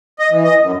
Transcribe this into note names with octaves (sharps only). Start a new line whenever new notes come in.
D#5
E3
D#5
F#2